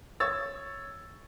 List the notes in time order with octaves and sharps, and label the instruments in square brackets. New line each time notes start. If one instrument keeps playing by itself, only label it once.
[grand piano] C#5 E6 A6